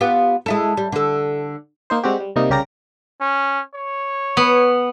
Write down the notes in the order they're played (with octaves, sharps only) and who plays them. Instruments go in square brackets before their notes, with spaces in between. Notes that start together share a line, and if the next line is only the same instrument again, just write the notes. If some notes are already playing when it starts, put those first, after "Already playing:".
[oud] B3 F4 G4
G#3 E4 A4
G3
D3 A4
[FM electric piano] A#3 D#4 C5
G3 G#3 C4 F#4 G4
G3
C3 G3 A#3 D#4
C2 C#3 G4 A#4 D5 A#6
[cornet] C#4
C#5
[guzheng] B3